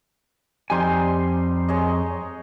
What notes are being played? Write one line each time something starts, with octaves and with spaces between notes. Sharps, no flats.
F2 G3 D#4 G#5 C6
G#3 C#5 D#5